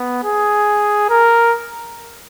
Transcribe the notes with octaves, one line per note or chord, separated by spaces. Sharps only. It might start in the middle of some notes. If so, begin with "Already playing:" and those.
Already playing: B3
G#4
A#4